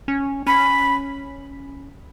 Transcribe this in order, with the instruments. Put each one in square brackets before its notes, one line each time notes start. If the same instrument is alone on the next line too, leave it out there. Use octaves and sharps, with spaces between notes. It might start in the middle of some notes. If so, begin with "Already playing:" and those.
[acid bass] C#4
[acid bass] C#4 [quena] B5